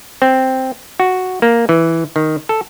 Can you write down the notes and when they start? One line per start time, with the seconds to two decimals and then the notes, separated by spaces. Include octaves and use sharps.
0.22 C4
1.00 F#4
1.42 A#3
1.69 E3
2.16 D#3
2.49 A4